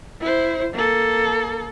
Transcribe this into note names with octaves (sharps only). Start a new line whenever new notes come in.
E4 C5
A#3 A4